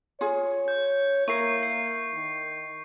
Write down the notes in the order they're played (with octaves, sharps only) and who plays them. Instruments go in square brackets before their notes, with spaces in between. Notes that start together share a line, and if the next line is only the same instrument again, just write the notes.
[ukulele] F4 G#4 [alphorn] C#5
[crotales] G6
[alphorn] A#3 [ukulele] E4 A#4 [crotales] C#6 C7
[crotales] C7
[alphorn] D#3